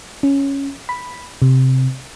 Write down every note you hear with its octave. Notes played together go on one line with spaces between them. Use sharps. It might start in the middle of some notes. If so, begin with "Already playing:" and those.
C#4
B5
C3